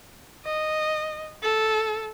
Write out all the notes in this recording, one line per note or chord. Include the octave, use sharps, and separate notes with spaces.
D#5
A4